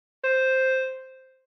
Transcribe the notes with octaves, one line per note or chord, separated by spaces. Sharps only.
C5